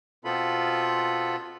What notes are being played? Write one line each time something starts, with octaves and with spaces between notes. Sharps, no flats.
B2 B3 C4 F4 A4 B5